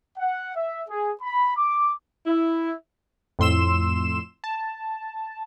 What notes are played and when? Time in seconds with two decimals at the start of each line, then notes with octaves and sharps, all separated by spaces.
0.18 F#5
0.55 E5
0.89 G#4
1.22 B5
1.57 D6
2.27 E4
3.39 F2 A2 C6 E6 E7
4.44 A5